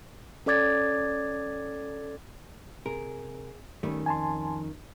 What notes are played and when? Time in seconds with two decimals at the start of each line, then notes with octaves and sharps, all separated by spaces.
0.46 C#4 A4 D5 D6 G#6 A6
2.86 C3 G#4 A#4
3.83 D#3 G3 A3 C#4
4.06 F2 G#5 A5 C6